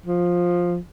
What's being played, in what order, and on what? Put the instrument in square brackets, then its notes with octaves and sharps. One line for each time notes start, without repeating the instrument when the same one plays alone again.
[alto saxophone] F3